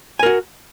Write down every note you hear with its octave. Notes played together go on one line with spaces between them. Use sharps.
F#4 A#4 G#5